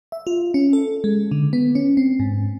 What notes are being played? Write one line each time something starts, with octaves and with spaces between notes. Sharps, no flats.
E5
F4
C#4
A4
G#3
D3
B3
C#4
C4
G#2